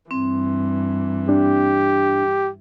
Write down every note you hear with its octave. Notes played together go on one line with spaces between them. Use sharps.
G2 E3 C4
D4 G4